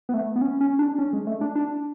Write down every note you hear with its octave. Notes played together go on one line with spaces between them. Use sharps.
B3
A3
B3
C#4
C#4
D4
C#4
G#3
A3
D4
D4